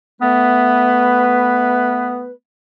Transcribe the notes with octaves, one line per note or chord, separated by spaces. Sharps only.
A3 B3 B4